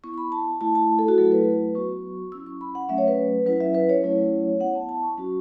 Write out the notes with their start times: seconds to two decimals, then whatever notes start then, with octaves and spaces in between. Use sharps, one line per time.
0.04 B3 E4 C#6
0.14 C#6
0.18 B5
0.32 A5
0.61 A3 E4 A5
0.75 A5
0.99 A4
1.08 F#4
1.18 F#3 A3 E4 A4
1.32 B4
1.75 F#3 B3 F#4 C#6
2.32 F#3 C#4 E4 E6
2.46 C#6
2.61 B5
2.75 F#5
2.89 F#3 A3 C#4 E5
2.98 C#5
3.08 B4
3.46 F#3 C#4 E4 B4
3.60 E5
3.75 B4
3.89 C#5
4.03 F#3 A3 C#4 E4
4.60 B3 E4 F#5
4.75 A5
4.89 A5
5.03 C#6
5.17 F#3 C#4 F#4